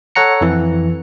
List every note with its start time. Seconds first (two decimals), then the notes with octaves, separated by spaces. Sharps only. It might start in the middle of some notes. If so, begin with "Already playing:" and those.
0.15 A4 C#5 F#5 A#5 C#7
0.41 F2 E3